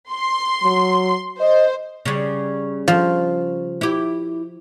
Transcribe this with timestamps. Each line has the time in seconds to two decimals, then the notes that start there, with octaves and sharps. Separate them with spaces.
0.12 C6
0.64 F#3
1.41 C5 D#5
2.05 C#3 G3
2.88 F3
3.81 E4 G4